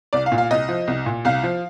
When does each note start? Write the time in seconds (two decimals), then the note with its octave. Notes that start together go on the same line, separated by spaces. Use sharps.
0.13 C2 D5
0.26 F5
0.32 A#2
0.38 F5
0.51 C2 D#5
0.69 F3
0.87 C2
1.06 A#2
1.25 C2 F5
1.43 F3